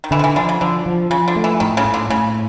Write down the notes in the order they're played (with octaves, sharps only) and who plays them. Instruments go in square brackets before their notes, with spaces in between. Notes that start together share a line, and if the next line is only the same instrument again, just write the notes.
[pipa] D#3
[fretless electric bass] D3 [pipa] E3
[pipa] F3
E3
[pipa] D3 [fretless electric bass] F3
[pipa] C#3
[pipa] D3 [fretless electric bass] F3
[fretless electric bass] F3
[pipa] C#3 [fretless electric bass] F3
[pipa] D3
[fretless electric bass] A3
[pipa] E3
[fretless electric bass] A2 [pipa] D#3
[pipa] C#3
[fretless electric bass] A2
[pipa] D3
[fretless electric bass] A2 [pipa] C#3